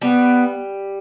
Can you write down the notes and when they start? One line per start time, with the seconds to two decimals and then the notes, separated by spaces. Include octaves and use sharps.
0.01 G3 B3 G4